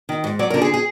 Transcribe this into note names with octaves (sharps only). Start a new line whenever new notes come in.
D#3
G#2
F#3 D5
D3 A#4
G#4
G#4